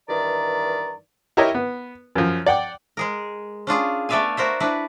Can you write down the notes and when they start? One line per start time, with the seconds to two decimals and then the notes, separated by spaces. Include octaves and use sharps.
0.09 G2 D#3 E3 D5 A#5
1.37 E4 G4 A#4 C#5 D#5 E5
1.55 B3
2.15 F#2 F3
2.46 D5 F#5 G5 D6
2.97 G#3 G#4 A#4
3.67 C#4 D4 F4 G#4
4.09 A3 B3 D5 E5 F5 G#5
4.37 F#4 A#4 C5 E5
4.60 D4 E4 B4